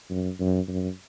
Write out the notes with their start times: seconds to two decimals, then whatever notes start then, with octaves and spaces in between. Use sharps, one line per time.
0.10 F#2
0.40 F#2
0.68 F#2